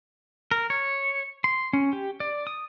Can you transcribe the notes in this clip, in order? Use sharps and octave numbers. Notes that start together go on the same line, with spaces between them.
A#4
C#5
C6
C#4
G4
D5
D#6